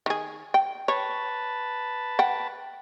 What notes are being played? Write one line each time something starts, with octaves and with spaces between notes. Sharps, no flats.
D#3 G#4
G5
B4 C#5 A5
F#5 G5